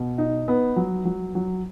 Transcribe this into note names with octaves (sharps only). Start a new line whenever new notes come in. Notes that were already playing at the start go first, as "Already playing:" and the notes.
Already playing: B2
D#4
B3
F#3
F#3
F#3